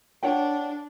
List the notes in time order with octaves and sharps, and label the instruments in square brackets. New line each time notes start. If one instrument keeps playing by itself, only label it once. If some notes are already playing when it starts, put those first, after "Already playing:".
[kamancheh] D4 [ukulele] C#5 F#5 G5